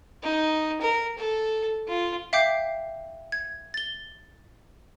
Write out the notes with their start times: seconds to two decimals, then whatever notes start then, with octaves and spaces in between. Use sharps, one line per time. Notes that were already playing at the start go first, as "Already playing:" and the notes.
0.23 D#4
0.81 A#4
1.18 A4
1.88 F4
2.33 E5 F5 G5 D6 G6 C7
3.32 G#6
3.74 A6 G7